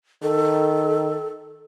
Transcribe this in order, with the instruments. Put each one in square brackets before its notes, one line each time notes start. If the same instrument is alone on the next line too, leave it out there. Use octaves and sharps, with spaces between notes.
[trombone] D#3 [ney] A4